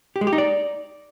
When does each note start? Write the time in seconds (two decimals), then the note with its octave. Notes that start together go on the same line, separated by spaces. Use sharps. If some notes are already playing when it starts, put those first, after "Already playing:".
0.16 G4
0.21 G#3
0.27 G4
0.33 D#4
0.38 D5